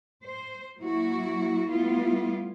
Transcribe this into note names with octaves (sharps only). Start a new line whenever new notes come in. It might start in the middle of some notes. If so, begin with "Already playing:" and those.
C5
F#3 A#3 E4 F#4
G3 A3 B3 E4 F4